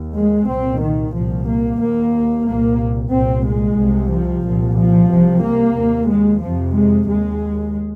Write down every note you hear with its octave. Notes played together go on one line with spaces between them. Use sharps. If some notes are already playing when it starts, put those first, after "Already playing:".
Already playing: D#2
G#3
C2 A#2 C4
D#3
C2 A#2 F3
A#3
D#2 A#3
C2 A#2 A#3
C2 A#2 C4
G#3
C2 C3
F3
C2 A#2
F3
C2 C3
A#3
D#2
G#3
F2 C3 F3
G#3
D#2 G#3